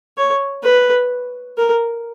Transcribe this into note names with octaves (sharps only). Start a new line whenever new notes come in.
C#5
B4
A#4